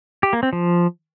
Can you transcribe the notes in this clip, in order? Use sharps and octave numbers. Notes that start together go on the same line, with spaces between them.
G4
A#3
C4
F3